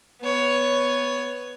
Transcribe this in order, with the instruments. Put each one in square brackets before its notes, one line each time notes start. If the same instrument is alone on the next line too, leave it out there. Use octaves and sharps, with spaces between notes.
[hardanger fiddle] B3 C#5